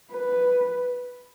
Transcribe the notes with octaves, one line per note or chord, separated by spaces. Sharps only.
B4